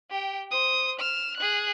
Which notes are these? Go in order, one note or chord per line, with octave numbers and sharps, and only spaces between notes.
G4 G5
C5 D#6
F6 E7
G#4 F#6